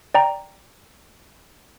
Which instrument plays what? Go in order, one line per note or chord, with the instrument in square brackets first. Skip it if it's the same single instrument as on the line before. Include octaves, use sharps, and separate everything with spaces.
[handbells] D5 G5 A#5